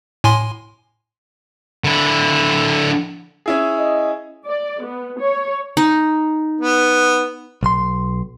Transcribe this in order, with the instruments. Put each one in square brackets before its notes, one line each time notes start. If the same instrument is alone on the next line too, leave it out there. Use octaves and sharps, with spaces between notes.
[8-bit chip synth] A2 G#5 C6
[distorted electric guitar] D3 E4
[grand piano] C#4 E4 G#4
[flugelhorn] D#5
[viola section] D5
B3
C#5
[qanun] D#4
[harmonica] B3
[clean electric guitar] B1 C6